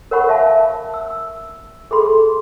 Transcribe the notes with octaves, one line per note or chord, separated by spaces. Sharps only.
A#4 C#5 F#5 B5 C#6
E5 F5 A5
E6
G#4 A4 B5 C6